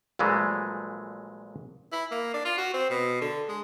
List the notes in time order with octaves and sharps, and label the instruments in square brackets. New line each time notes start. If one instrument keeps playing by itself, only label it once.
[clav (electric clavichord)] A#1 A#2 E3 F#3 G#3 A3
[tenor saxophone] E4
A#3
D4
F4
F#4
C4
B2
D3
G#3